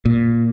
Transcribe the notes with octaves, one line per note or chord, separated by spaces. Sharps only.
A#2